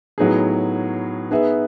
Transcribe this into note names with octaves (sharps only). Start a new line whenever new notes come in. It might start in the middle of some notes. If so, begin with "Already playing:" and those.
A2 F#3 B3 D#4 G#4
B3 D#4 G#4 B4 E5